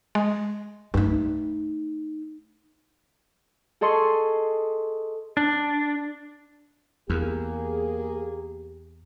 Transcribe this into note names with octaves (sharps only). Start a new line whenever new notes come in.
G#3
G2 A3 D#4
G#4 A4 D#5 C6 C#6
D4
E2 A#3 G4 G#4